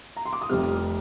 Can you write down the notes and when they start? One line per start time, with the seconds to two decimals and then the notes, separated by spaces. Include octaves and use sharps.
0.17 A#5
0.25 C6
0.33 D6
0.41 D#6
0.49 F1 F2 C3 G3 F6